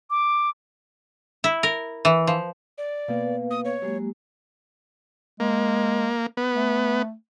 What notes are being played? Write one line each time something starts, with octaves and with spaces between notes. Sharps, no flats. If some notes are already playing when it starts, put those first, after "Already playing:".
D6
E4
A#4
E3
F3
D5
B2 A#3 B3 B4 F5
D#6
C#5
F#3 G#3 A#3 G4
G#3 A#3
B3
A3